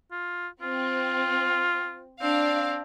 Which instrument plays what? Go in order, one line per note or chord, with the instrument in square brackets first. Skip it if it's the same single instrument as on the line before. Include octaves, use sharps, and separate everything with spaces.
[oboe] F4
[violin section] C4 [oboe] F4
[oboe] C4 [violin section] D4 F5